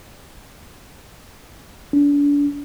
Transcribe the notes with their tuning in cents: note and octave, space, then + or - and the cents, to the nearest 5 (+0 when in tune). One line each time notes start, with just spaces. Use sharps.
D4 -35